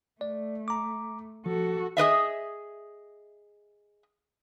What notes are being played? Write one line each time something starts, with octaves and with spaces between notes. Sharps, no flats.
A3 D5
A#5 D6
F3 F#4 A4
G#4 B4 D#5 E5